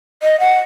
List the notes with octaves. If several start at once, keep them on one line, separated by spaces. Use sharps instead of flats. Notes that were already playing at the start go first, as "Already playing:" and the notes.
D#5
F#5